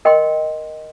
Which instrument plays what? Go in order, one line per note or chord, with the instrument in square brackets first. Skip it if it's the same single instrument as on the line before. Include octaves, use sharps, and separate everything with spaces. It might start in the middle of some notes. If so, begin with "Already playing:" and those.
[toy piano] A#4 D#5 G5 C6